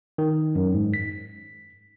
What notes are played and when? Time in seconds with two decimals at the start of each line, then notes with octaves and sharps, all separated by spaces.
0.18 D#3
0.55 F#2
0.74 G#2
0.94 B6